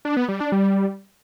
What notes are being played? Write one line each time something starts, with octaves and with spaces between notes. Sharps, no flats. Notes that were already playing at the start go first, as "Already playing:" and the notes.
D4
B3
G3
D4
G3